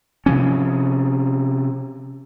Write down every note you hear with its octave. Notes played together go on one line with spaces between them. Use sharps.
C3 F3 C#4